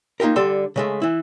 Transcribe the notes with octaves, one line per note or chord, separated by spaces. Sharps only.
A#3 D#4 F4 G4 A#4
D3 G3 A4 C6
C#3 G#3 A3
E3 E4